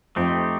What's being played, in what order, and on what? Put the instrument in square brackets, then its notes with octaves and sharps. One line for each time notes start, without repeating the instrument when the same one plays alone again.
[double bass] F2 [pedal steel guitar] A3 C4 D#4 G4